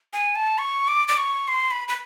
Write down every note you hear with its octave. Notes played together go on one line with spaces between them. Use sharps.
G#5
A5
C#6
D6
D6
C#6
C6
B5
B5